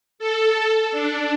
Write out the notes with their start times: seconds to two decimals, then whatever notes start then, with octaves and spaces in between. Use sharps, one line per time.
0.19 A4
0.91 D4